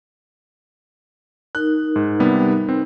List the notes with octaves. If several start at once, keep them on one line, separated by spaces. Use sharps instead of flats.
D#4 A#4 F#6
G#2
C3 G3 B3
C4